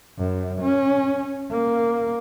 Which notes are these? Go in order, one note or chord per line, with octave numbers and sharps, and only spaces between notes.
F#2
C#4
A#3